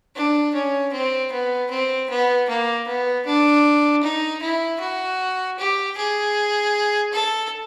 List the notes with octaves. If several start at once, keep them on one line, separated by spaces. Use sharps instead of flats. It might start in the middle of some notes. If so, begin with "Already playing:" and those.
D4
C#4
C4
B3
C4
B3
A#3
B3
D4
D#4
E4
F#4
G4
G#4
A4